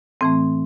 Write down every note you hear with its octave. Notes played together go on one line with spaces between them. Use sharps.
A2 E3 A3 C4